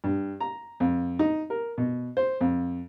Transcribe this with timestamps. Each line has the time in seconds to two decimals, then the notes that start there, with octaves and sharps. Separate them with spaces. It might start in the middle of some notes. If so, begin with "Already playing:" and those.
0.04 G2
0.40 A#5
0.80 F2
1.19 D#4
1.50 A#4
1.78 B2
2.17 C5
2.41 F2